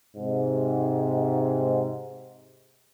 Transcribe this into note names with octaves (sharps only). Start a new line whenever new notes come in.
G#2 C3